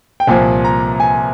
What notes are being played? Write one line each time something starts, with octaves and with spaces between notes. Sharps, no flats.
G5
C2 A#2 F3 G#5
A#5
G#5